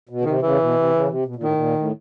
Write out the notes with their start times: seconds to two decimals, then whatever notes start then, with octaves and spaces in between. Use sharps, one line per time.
0.09 B2
0.21 C#3
0.25 C3 D#3
0.42 C#3 E3
0.60 B2
0.76 C3
0.93 C#3
1.09 C3
1.26 B2
1.36 A#2
1.43 A2 D#3
1.53 A#2
1.77 A2